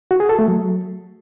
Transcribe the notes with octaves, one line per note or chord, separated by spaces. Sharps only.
F#4
G#4
A4
A3
F#3